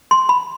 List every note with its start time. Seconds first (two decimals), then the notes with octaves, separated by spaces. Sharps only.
0.11 C6
0.29 B5